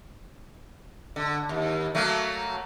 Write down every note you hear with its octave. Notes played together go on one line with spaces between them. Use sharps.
D3
D#2
F#3 A3 A#3